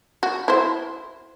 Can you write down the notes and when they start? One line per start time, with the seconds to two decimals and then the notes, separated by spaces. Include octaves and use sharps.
0.23 F#4
0.48 E4 C5